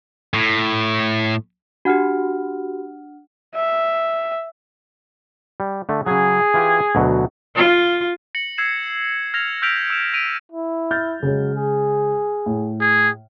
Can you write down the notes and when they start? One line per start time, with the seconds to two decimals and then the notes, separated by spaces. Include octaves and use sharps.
0.34 A2
1.85 D4 F#4 G4 F#5 F6
3.55 E5
5.60 G3
5.89 D3 A3
6.06 C#3 F#3 G#4
6.54 E3 F4 G4
6.95 D2 B2 F#3
7.56 F4
8.35 A#6 C#7 F#7
8.58 E6 G#6 C7 E7
9.34 F6 G#6 A#6 C7 F7
9.62 E6 F6 G6 B6 D7 F7
9.90 E6 E7 F7
10.14 A#6 B6 D7 D#7 F7
10.52 E4
10.91 F6 G6 A6
11.23 C#3 F#3 G#3
11.56 G#4
12.46 A2
12.81 G#4